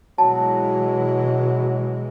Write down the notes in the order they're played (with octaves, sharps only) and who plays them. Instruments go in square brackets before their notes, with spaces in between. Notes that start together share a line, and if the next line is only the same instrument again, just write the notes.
[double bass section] B2 E3 G#3 [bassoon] F#3 [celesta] A5